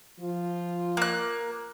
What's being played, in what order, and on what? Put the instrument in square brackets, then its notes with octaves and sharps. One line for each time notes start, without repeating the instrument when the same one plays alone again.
[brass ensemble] F3 F4
[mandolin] A#3 F#6